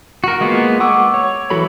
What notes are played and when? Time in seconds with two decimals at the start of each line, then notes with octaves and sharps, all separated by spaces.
0.24 F#4 A#4
0.41 G#3 A#3 B3 F4
0.80 F#5 C#6 D6 E6
1.14 C#5
1.50 E3 F#3 F#4 A4 B5